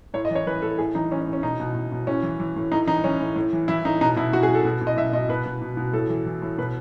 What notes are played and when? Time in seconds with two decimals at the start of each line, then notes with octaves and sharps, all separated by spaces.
0.14 A2 C#5
0.25 D#5
0.31 E3 C#5
0.47 E3 B4
0.62 A2 A4
0.78 A2 G#4
0.95 E3 D#4
1.11 E3 C#4
1.21 C#4
1.27 A2
1.33 C#4
1.43 B2 D#4
1.60 B2
1.75 B2
1.92 B2
2.07 A2 C#4
2.23 E3
2.40 E3
2.56 A2
2.72 A2 D#4
2.87 E3 D#4
3.04 E3 C#4
3.21 A2
3.36 A2
3.53 E3
3.68 E3 E4
3.85 A2 D#4
4.01 B2 D#4
4.16 B2 E4
4.33 B2 F#4
4.43 G#4
4.48 B2
4.54 A4
4.65 B2
4.81 B2
4.87 D#5
4.97 B2 E5
5.13 B2 D#5
5.29 B2 B4
5.46 B2
5.62 B2
5.77 B2
5.93 A2 A4
6.09 E3
6.26 E3
6.42 A2
6.58 B2 B4